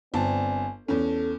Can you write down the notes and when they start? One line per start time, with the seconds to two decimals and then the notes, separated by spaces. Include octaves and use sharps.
0.14 G1 C4 D5 G#5 A5
0.88 E2 C#4 A4